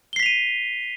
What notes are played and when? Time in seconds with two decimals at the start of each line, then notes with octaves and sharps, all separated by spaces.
0.13 G7
0.16 C7
0.19 B6
0.23 F7
0.26 D#7